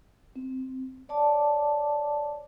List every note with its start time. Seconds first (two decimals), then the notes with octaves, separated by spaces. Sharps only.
0.36 C4
1.09 C#5 D5 A5 D6